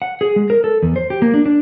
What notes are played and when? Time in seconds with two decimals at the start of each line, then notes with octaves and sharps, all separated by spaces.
0.02 F#5
0.21 G#4
0.36 G#3
0.50 A#4
0.64 A4
0.82 E2
0.96 C5
1.10 G4
1.22 A#3
1.34 D4
1.45 D4